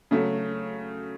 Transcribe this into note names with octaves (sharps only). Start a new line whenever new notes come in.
C#3 F#3 A3